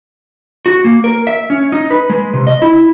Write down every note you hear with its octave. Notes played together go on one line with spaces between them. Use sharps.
F#4
A#3
A#4
E5
C#4
D#4
B4
G#3
C3
D#5
E4